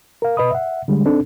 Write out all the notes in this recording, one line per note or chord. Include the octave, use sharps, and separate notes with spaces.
A#4 F5
B2 B4 D#5 B5 D#6
E5 F#5
D3 G3 G#3
C4 D4 D#4 A4